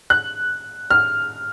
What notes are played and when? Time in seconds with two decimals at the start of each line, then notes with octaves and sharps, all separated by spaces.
0.10 F#6
0.90 F6